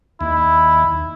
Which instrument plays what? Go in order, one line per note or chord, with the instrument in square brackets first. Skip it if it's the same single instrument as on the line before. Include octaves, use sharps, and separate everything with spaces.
[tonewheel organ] D#2 [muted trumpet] E4